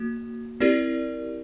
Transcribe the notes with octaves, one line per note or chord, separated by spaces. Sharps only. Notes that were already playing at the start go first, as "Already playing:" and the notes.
Already playing: A#3 F#4
C4 E4 G4 A#4 D5